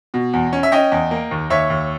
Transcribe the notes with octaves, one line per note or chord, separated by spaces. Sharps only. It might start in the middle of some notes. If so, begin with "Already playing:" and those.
B2
E2
C#4
E5
C#4 D#5 G5
E2
A#3
D#2
D#2 C#5 E5
D#2